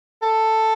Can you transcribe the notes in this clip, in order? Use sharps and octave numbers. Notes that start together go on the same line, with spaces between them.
A4